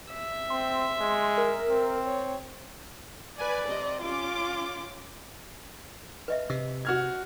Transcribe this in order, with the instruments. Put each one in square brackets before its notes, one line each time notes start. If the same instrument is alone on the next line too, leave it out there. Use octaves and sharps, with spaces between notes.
[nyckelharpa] E5
[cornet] C4 [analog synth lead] C6
[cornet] G#3
[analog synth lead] A#4
[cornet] C4
[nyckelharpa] C#5
[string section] B4 G#5 [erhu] D5
[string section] C3 D#5
[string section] C#4 D6 [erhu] F4
[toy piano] B4 D#5 E5
[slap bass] C3 [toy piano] E6
[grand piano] F#4 F6 G#6